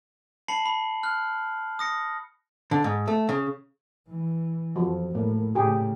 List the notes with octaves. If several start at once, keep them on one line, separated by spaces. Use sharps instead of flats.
A5 B5 C7 C#7 F#7
B5
F6 F#6
D#6 A#6 C#7
D3
G#2
A3
C#3
E3
F2 F3 F#3
A2 A#3
A2 C#3 G4 G#4